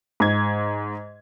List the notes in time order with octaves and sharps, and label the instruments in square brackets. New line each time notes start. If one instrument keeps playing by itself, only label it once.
[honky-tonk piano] G#2 G#6